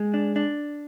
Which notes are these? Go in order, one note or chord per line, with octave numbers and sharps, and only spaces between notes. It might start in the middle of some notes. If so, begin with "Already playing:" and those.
Already playing: G#3
D4
D4